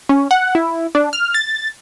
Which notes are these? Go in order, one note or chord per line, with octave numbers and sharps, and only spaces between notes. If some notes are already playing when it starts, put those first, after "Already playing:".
C#4
F#5
E4
D4
F6
A6